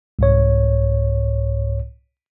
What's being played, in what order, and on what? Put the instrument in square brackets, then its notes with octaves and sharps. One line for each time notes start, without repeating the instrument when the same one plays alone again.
[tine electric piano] C2 G#2 C#5